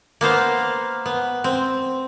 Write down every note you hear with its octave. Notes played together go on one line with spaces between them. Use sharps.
A#3 B3 C5 F5
B3
C4